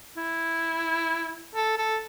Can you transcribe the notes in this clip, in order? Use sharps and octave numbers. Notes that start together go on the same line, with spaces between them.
E4
A4
A4